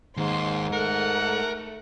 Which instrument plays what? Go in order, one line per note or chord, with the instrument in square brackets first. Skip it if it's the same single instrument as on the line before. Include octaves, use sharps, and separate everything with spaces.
[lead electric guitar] D#2 [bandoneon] G#2 [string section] C6
[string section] A3 [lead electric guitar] A#4 [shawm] F#5